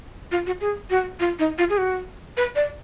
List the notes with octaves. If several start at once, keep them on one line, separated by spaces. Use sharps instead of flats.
F4
F#4
G#4
F#4
F4
D#4
F4
G#4
F#4
B4
D5